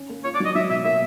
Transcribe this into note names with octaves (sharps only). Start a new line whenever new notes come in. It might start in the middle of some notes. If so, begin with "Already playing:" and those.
Already playing: C#4
A#3
F4 C#5
D5
F#3
D#5
F#3 E5
B2 E5
A#3 E5